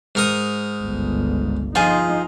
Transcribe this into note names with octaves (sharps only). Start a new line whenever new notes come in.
G#2 A#4 D#6
G1 C#2
F3 D#4 F4 G#4